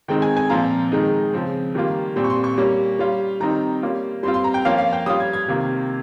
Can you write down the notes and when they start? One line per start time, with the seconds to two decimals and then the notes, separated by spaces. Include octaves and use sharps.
0.08 D#3 G#3 C4 D#4 G5
0.22 G#5
0.37 G#5
0.50 A#2 F3 C4 F4 A#5
0.92 D#3 G#3 D#4
1.34 C#3 F3 C4
1.75 D#3 G3 A#3 F4
2.16 A#2 G3 C4 C6
2.24 C#6
2.30 C6
2.44 C#6
2.57 G3 A#3 C#4
2.99 G3 C#4 F4
3.40 D#3 G3 C4 D#4 A#5
3.83 G3 A#3 C#4 F4
4.23 G3 C4 F4 C6
4.34 C6
4.44 A#5
4.54 G5
4.65 F3 A#3 C#4 F4 F5
4.78 F5
4.93 G5
5.06 G3 C#4 F4 D#6
5.20 G#6
5.33 G#6
5.48 C3 D#3 A#3 F4